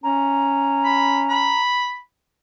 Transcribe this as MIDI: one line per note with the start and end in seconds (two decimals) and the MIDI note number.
0.04 1.56 61
0.04 1.61 82
0.85 1.21 83
1.29 1.99 83